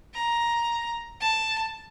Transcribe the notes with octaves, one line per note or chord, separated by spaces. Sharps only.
A#5
A5